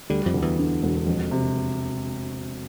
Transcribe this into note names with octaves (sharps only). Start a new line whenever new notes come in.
D2 D3 G3
F2 F3
D2
E2 E3
D3
E1
F2
C3